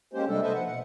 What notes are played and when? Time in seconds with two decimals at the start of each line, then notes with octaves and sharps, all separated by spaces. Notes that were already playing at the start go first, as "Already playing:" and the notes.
0.14 G#3 A#3 C#4 G4 C5
0.28 C3 G3 G#3 A#3 D4 A4
0.42 D4 A4 B4 C5 D#5 E5
0.53 F3 F#5
0.66 B2 F#5